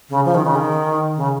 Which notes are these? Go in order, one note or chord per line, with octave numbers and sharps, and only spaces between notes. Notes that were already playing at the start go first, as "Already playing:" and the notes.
C#3
F3
D#3
C#3
D#3
C#3